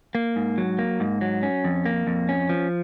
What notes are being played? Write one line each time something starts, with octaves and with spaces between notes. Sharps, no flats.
A#3
G#2
F#3
A#3
G#2
F#3
C#4
F2
A#3
F2
C#4
F3